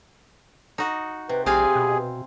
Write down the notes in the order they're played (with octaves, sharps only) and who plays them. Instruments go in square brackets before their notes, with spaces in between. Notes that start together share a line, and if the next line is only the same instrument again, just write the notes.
[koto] D#4 F#4
[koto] C3 [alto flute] B4
[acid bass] A#1 [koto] C4 F5 G#5 [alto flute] G4 [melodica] G#4
[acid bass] B2